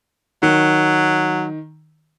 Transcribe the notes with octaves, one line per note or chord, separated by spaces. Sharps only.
D#3 F#3